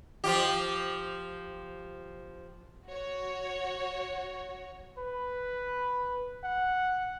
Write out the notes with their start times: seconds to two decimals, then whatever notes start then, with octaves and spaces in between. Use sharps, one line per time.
0.24 F3 F4 G4
2.86 F#4 C#5
4.98 B4
6.44 F#5